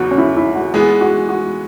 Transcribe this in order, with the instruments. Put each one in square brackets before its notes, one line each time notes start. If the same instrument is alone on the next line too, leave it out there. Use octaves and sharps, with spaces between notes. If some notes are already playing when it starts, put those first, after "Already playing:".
Already playing: [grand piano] E2 C#3 F#3 B3 [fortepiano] F#4
[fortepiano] C#4
E4
E4
F#4
[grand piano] E3 G#3 B3 [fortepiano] G#4
[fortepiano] F#4
F#4